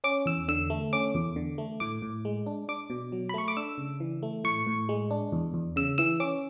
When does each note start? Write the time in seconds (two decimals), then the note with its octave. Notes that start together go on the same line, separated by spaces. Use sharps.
0.04 C#4 D6
0.26 E2 E6
0.48 D3 E6
0.70 A3
0.93 C#4 D6
1.15 E2
1.36 D3
1.58 A3
1.80 A2 D6
2.02 A2
2.25 G#3
2.46 D4
2.68 D4 D6
2.90 B2
3.12 F#3
3.29 B5
3.34 A3 C#6
3.48 D6
3.57 D4 E6
3.78 C#3
4.00 E3
4.23 A3
4.44 A2 C#6
4.67 A2
4.89 G#3
5.11 D4
5.32 E2
5.54 E2
5.76 C#3 E6
5.98 E3 E6
6.20 C#4 D6